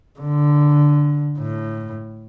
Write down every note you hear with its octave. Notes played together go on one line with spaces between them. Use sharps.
D3
A2